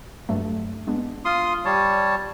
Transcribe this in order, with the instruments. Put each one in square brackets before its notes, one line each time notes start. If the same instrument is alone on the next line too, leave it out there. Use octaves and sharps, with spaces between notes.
[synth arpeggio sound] G2 F#3 A3
G#3 B3 D4
[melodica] F4 C6 D#6
G3 C#5 A5